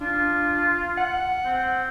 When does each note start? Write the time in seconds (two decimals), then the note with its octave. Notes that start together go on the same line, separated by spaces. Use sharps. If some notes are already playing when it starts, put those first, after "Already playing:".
0.01 D4 F4
0.97 F#5
1.45 C4